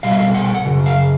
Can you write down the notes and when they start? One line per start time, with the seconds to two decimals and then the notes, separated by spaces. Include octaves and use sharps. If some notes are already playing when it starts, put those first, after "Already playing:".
0.03 B2 G3 F5
0.11 E5
0.19 F5
0.34 F#5
0.44 G5
0.55 F#5
0.65 F#2 C#3
0.86 F5